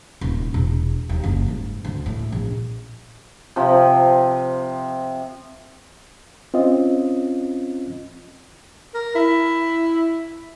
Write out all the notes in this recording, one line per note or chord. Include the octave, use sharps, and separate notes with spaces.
D#1
E1
D#2
F#1
G#2
D2
A2
A#1
C3 F3
C4 C#4 F4 D#5
A#4
E4